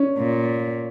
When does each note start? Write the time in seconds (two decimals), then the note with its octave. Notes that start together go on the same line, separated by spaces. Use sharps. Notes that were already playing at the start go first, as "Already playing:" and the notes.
Already playing: C#4
0.18 A#2